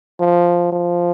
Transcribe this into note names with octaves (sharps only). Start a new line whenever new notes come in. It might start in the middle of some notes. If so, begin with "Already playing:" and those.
F3
F3